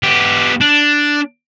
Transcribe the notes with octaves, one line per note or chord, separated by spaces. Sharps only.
B3 G4
D4